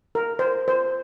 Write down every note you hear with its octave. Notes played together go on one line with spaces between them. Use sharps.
A#4
C5
C5